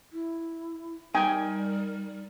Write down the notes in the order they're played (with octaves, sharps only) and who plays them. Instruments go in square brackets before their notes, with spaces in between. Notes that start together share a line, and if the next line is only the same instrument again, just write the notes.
[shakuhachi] E4
[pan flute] G3 [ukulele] D#4 [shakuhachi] A#4 [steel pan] G5 G#5